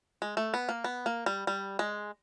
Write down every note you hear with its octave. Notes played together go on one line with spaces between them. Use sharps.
G#3
A3
B3
A#3
B3
A#3
G3
G3
G#3